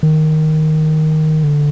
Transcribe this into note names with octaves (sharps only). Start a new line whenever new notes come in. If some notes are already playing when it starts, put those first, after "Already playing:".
D#3
D3